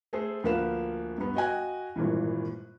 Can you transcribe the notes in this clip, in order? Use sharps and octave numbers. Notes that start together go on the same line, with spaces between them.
A3 G#4 A4 C5
D2 F3 A#3 B4 F5 E7
G2 B3
F#4 D#5 G5 G#5 F#6
G#1 G2 A#2 E3